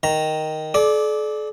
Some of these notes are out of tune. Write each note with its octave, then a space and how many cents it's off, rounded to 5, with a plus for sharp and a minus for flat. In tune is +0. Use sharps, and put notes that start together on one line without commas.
D#3 +0 A#5 +0
A4 -45 D5 +10 D6 +0